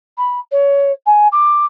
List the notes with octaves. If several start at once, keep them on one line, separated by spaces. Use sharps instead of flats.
B5
C#5
G#5
D6